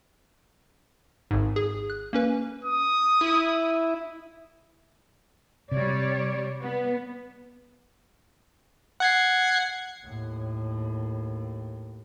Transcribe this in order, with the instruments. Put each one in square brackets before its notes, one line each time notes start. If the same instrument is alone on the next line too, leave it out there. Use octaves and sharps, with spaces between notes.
[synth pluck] G#1 G#2
G#4
F#6
A#3 C#4 B4
[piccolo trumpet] D#6
[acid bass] E4
[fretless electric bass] C3 [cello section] G3 C#5 D5
[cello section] B3
[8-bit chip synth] F#5 G#6 C7
[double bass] D#2 A2